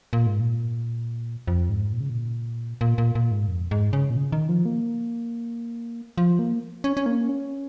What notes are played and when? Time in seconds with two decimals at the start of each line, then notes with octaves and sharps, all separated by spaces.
0.13 A#2
0.27 G#2
0.40 A#2
1.48 F2
1.69 G#2
1.92 A#2
2.00 C#3
2.10 A#2
2.81 A#2
2.98 A#2
3.15 A#2
3.31 G#2
3.48 F2
3.71 G#2
3.93 C#3
4.10 A#2
4.16 C#3
4.32 D#3
4.49 F3
4.66 A#3
6.18 F3
6.39 A#3
6.84 C#4
6.97 C#4
7.06 A#3
7.29 C#4